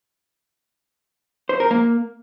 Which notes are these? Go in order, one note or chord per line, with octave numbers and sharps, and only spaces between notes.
C5
A#4
A#3